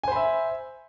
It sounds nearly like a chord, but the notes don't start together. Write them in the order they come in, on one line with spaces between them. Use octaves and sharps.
G#5 C5 B5 E5